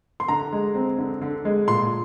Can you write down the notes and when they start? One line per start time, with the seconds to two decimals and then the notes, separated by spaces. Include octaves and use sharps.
0.20 C6
0.28 D3 A#5
0.53 G#3
0.75 C4
0.99 D3
1.22 D3
1.45 G#3
1.68 A#2 C6